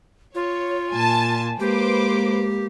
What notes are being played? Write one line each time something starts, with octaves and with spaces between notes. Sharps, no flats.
F4 C#5
A#2 G#5 A5 A6
G#3 A#3 G4 B4 C5 D6